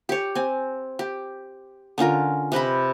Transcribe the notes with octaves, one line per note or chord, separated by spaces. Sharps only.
G4 C#5
C4 G#5
G4
D3 C#4 F4 A#4
C3 B4 D#5 B5